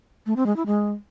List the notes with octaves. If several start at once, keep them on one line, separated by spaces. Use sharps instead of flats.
A3
C4
G#3
E4
G#3